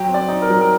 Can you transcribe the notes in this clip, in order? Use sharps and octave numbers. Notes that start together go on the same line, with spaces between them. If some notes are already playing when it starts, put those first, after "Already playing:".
Already playing: F#3 G5
C4
D5
D#4
A#4
F#3
A#4